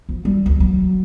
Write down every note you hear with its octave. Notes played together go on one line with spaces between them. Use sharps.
F3
G3
D2
F#3